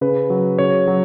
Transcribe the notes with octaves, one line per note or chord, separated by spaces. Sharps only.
C#3 B4
F#3
C#3 C#5
F#3